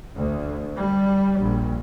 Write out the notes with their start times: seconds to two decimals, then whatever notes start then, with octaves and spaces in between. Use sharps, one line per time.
0.16 D2
0.78 G3
1.41 A#1